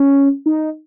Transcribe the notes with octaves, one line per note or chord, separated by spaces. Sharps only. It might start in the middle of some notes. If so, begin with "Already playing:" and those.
Already playing: C#4
D#4